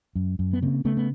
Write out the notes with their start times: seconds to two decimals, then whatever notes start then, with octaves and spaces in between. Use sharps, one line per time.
0.15 F#2
0.39 F#2
0.53 B3
0.62 C#3 A#3 C4
0.85 C#3 A3 B3
0.97 B3